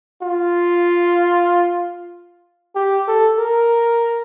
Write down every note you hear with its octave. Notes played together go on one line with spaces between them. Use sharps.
F4
G4
A4
A#4